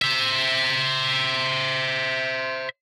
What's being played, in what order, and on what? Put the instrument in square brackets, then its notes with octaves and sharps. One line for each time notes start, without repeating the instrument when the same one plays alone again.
[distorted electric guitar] C5 E5